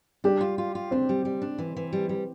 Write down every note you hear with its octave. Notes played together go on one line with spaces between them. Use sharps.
G3 D4 G4
F4
F4
F4
C4 D4
G3
G3
D4
E3
E3
G3
G3